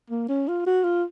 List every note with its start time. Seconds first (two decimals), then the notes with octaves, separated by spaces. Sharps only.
0.10 A#3
0.29 C#4
0.48 F4
0.66 F#4
0.84 F4